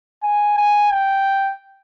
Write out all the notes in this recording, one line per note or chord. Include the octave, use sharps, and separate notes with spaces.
G#5
G#5
G5